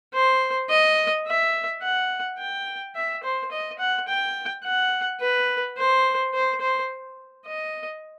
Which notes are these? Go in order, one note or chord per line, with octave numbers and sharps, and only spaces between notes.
C5
D#5
E5
F#5
G5
E5
C5
D#5
F#5
G5
F#5
B4
C5
C5
C5
D#5